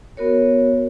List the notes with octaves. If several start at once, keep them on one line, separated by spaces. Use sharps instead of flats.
B3 F#4 A#4 C#5